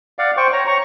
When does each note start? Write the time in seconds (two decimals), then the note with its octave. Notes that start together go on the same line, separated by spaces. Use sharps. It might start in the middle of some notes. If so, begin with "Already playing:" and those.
0.19 D5 F5 F#5
0.37 C5 G5 C#6
0.53 C#5 A#5
0.67 A#5 C#6